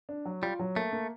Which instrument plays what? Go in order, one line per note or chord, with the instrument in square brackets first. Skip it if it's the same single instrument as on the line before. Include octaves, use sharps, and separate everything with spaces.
[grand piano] D4
F#3
[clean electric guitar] G3 [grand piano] F4
[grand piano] F#3
[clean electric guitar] A3 [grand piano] A#3
[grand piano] A#3